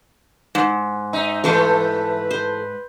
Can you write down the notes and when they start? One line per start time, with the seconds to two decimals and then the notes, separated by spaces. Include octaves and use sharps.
0.55 G#2
1.13 D#4 E5
1.44 E3 A3 A4 B4 C5 F5
2.31 C5